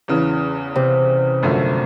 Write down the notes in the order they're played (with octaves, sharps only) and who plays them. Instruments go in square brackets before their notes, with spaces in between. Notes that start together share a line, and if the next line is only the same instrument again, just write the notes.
[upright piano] E2 C#3 E3
[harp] C3
[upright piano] G#1 F#2 D3 F3 A3